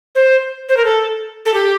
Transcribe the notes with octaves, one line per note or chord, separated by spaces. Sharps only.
C5
C5
A#4
A4
A4
G4